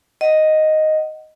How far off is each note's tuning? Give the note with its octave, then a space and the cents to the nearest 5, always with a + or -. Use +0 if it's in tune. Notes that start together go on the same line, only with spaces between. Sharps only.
D#5 +0 F#5 +10